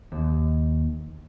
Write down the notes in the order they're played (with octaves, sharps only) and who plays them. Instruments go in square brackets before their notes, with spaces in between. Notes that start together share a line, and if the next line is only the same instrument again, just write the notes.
[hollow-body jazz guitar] D#2